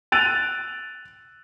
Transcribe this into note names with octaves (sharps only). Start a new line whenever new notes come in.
E6 F#6 A6 D7 D#7 F7